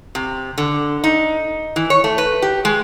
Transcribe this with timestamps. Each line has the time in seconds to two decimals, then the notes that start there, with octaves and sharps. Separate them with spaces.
0.15 C3
0.58 D3
1.04 D#4
1.76 E3
1.90 C#5
2.04 A3
2.18 B4
2.42 G4
2.65 G#3